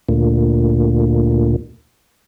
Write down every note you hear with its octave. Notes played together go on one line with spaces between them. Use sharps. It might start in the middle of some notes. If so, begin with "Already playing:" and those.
D2 A#2